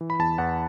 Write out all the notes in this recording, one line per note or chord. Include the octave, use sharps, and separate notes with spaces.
E3
B5
E2 A5
E2 F#5